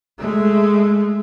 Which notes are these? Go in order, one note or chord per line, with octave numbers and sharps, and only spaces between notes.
G#3 A3